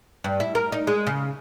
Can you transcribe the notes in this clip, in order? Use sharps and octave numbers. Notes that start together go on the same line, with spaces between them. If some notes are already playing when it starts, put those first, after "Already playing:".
G2
E4
A#4
D#4
G#3
C#3